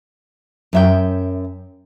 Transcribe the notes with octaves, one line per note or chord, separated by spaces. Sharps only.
F#2 E5 G5